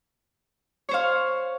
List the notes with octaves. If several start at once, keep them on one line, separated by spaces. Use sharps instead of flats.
C5 C#5 F5